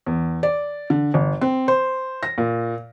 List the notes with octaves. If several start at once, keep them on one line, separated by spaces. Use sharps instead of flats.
E2
D5
D3
G1
C4
C5
A#6
A#2